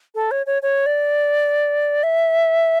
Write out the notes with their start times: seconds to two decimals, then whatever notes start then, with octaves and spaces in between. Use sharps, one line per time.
0.15 A4
0.31 C#5
0.46 C#5
0.62 C#5
0.86 D5
2.03 E5